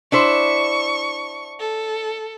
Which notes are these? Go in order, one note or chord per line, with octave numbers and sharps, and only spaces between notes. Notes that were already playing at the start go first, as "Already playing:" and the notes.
D4 E4 C5 C#6
A4